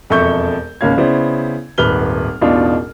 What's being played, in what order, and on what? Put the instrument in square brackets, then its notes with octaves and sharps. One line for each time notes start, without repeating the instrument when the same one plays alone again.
[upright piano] E1 F2 A4 E5 C#6 G6
G#1 C#2 A#3 C#4 F5 G#6
C#3 B3 E4 C5 D5
D#1 G#1 B4 F6 G7
E1 A1 B2 D4 D#4 F4